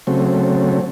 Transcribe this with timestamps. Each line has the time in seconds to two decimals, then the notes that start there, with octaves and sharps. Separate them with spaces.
0.07 C#3 F#3 A3 C4